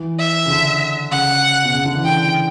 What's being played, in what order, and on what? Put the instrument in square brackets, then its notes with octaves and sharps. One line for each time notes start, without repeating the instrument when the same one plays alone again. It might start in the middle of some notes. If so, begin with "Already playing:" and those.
Already playing: [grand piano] E3
[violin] E5
[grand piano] C#3
D3
[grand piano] C#3 [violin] F#5
[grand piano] B2
C#3
D3
E3
[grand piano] D3 [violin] G5